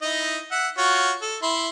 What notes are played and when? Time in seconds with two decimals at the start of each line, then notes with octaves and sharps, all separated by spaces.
0.02 D#4 E4 D#5
0.51 E5 F#5
0.78 F4 F#4 C#5
1.22 A4
1.43 E4 C6